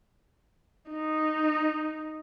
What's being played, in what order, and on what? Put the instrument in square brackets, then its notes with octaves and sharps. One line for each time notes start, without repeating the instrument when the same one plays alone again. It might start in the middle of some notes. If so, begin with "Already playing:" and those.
[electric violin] D#4